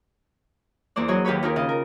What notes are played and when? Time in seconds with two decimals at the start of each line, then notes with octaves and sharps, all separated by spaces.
0.96 E2 A#3 C5 D5
1.08 F#3 G#4 C#5 D#5
1.25 D#2 G4 B4 C#5 B5
1.43 D#4 F4 G4 G#4 A#4
1.56 C#3 D#5 F5
1.69 A#4